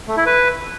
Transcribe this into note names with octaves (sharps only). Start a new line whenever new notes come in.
A3
E4
B4